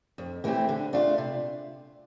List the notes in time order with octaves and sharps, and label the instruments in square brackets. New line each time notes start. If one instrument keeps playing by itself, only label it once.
[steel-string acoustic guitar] F2
E3 A3 C4 G4
D3
A3 D4 F4
C3